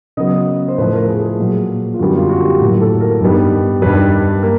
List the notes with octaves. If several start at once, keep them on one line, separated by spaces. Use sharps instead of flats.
C#3 F#3 B3 D#5
C5
A2 F3 A3 B4
A#4
G#4
G#4
A#2 F#3 A#3
F4
F#2 D3 G3 B3 F#4
F4
F#4
G4
A2 F#3 A#3
A4
A#4
G2 D#3 G3 B3
G2 D#3 G3 B4
A#3